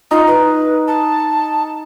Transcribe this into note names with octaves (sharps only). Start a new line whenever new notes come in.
D#4 F4
B4
A5